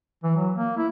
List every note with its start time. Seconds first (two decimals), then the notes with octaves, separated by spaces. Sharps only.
0.24 E3
0.37 F#3
0.56 A#3
0.78 E4